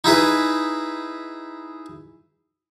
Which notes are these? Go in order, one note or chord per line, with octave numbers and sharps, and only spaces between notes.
D#4 E4 G#4 B4